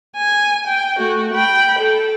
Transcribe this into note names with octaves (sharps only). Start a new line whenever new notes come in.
G#5
G5
A3 F#4
G5 B5
A4